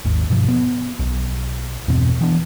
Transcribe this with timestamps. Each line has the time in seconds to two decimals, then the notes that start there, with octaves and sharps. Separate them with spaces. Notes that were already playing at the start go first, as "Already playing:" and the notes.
0.05 G#1 D#2
0.30 G2 B2 F3
0.48 B3
0.99 B1
1.88 E2 G2 B2 C4
2.21 E3 B3 D4